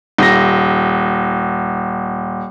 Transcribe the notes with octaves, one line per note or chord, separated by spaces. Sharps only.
D#1 A#6